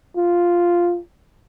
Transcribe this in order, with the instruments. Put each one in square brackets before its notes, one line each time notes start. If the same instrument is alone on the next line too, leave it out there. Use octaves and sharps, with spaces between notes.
[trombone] F4